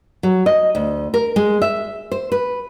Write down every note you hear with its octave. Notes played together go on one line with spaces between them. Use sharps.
F#3
D#5
D2
A#4
G#3
E5
C5
B4